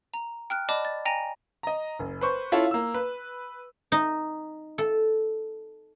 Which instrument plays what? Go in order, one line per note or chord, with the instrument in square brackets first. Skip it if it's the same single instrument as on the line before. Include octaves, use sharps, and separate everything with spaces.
[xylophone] A#5
G5 F6 F#6
D5 D#5 A5 B5 D6
A6
G5 G#5 A#5 A#6
[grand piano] D#5 A#5
F#1
B4 C5 C#6
C#4 E4 F4 A4 C#5
A#3 E6
B4
[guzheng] D#4
A4